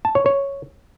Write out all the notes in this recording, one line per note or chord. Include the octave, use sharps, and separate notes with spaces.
A5
C#5
C#5